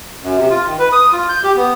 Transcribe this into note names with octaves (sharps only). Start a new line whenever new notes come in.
F#2
C3
F4
D#3
B4
D#6
F4
G6
G4
B3